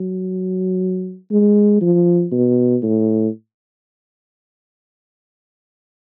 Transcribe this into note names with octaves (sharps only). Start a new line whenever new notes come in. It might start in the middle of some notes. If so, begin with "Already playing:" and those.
Already playing: F#3
G#3
F3
B2
A2